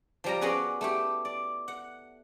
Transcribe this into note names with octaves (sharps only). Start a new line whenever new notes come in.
F3 G3 A#5
B3 C#4 F#4 G#4 B4 D5
A3 E4 G4
D5
F#5